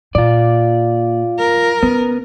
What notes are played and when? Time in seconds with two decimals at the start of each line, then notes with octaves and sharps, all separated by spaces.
0.15 A#2 F4 D5
1.39 A#4
1.83 C#3 B3